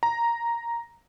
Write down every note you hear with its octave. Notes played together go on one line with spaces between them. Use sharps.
A#5